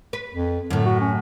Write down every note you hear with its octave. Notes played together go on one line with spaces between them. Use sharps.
B4
F2
F#2 A2 D3
F#4
C#4